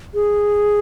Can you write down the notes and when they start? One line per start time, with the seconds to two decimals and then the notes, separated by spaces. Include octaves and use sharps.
0.14 G#4